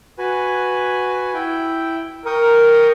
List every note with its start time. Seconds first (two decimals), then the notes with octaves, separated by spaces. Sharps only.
0.19 F#4 B4 G#5
1.34 E4 G5
2.26 A#4 G5 C#6 D#6